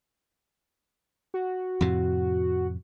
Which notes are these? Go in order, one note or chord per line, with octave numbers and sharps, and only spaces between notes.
F#4
F2 A2 C3